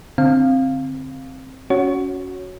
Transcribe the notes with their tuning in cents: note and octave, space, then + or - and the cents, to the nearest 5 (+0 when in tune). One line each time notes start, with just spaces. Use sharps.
D3 +0 C4 +10 F5 +0
C#4 +15 F#4 +0 C#5 +0